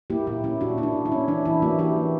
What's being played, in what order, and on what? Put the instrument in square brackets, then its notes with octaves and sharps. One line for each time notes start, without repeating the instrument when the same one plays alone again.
[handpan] A#3 E4 G4
A#2 E4
C#4 E4
A#2 D4 F#4
A#3 E4
D4
A#2
E4
C#4
E3 D4
E3 E4
A#3 D4 F#4
E3 E4 G4
A#3